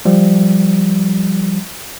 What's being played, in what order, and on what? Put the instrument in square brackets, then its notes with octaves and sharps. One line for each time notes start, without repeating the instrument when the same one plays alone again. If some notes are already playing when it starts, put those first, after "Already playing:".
[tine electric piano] F3 G3